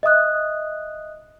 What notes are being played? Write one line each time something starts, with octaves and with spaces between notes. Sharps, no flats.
D#5 E5 D#6 F#6